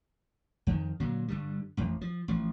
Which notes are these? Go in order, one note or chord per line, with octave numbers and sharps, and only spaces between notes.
F2 D#3
A#2 D3 F#3
G2 D3 G3
A1 F2
F3
A1 F3